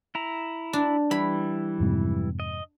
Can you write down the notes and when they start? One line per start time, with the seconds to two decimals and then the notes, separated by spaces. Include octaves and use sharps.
0.15 E4 A#5
0.73 D4
1.11 E3 G3 E4 B5
1.80 F2 G#2 C3
2.40 D#5